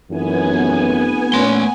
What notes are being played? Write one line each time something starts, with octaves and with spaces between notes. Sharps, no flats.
F1 F#2 E3 B3 G#5
A#2 A3 C#4 C6